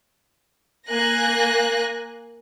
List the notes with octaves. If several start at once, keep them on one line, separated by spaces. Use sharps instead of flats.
A#3 G#5 F#6 A#6